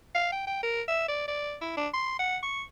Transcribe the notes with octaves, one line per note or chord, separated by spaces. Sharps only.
F5
G5
G5
A#4
E5
D5
D5
E4
D4
C6
F#5
C#6